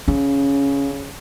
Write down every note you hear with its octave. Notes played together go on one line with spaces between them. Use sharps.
C#3 C#4